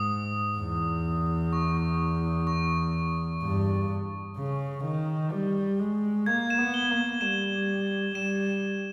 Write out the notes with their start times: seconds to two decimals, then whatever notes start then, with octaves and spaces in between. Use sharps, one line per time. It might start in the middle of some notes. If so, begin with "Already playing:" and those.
Already playing: G#2 D#6
0.58 E2
1.53 C#6
1.77 C#6
2.47 C#6
3.42 G2
4.37 C#3
4.84 D#3
5.31 G3
5.79 G#3
6.26 A#3 G#6
6.50 E7
6.58 B3
6.74 G7
6.90 A#3
6.97 E7
7.20 G3 E7
8.15 G3 E7